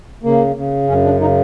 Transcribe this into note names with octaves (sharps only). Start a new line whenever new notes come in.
C#3 A#3
C#3
F#2 C#4
D4
C#3 D#4